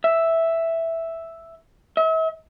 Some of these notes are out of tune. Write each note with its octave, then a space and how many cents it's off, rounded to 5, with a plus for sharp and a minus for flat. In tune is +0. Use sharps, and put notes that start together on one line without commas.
E5 +0
E5 -40